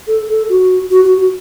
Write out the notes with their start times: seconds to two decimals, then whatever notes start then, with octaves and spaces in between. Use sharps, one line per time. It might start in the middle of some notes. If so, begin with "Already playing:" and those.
0.07 A4
0.28 A4
0.49 F#4
0.91 F#4
1.04 F#4
1.18 F#4